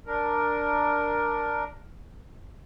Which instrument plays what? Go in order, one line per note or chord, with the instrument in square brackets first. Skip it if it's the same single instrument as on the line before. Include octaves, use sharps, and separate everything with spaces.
[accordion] D4 A#4